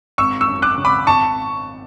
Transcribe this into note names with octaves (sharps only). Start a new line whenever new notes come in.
G#1 C#6 E6
C#6 E6
F#2
D6 F#6
C#3
B5 D6
G#1 A5 C#6